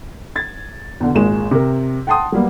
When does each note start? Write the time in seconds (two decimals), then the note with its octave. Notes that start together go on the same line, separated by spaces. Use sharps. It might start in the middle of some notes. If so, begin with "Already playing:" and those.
0.36 G#6 A6
1.00 E2 B2 D3
1.15 G#1 A#2 G#3 E7
1.51 C3 A#4
2.07 F#5 G5 A5 C6 D#6
2.32 F#3 G3 A#3 B3